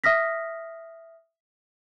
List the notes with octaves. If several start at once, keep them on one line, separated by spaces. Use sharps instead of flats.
E5 D#6 F6 A#6 B6